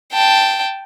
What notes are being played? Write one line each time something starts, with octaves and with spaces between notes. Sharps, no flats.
G5 A5